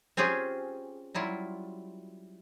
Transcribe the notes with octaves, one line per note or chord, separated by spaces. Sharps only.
C4 C#4 F4 G4 G#4
F#3 G3 E4 F4